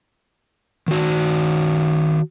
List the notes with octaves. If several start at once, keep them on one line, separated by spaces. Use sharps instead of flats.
D#3 F#4